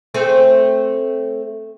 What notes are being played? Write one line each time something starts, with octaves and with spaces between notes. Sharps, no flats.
A3 C4 G#4